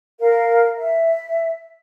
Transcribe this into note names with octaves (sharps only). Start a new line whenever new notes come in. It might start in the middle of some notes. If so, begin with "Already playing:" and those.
A#4 F5
E5